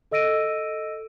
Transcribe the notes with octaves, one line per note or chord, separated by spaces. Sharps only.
A4 D#5 E6 A#6 D7 D#7